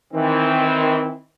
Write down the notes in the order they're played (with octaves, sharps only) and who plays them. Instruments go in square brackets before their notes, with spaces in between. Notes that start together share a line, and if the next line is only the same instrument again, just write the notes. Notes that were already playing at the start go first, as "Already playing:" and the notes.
[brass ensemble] D#3 E3 C4